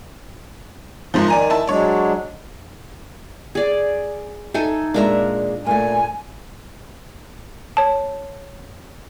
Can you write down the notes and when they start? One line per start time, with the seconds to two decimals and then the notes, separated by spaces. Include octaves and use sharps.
1.14 F#1 G#2 F3
1.28 D#3 D5 G#5 A#5
1.50 E4 A5
1.67 F#3 G#3 D4 C#5 D5
3.55 G#4 D5
4.54 D#4 A4 E5 G#5
4.94 A#2 G#3 A#3 D4 A#4 E5
5.66 A#2 A3 G#5
7.77 C#5 A5